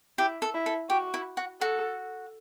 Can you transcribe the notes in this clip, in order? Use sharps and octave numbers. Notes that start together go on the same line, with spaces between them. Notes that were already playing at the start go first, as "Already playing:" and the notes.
E4 G4
A4
E4
A4
F#4 G4
E4
F#4
F#4 A4